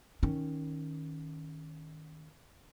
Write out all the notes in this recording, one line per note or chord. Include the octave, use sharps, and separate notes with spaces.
D#3 C#4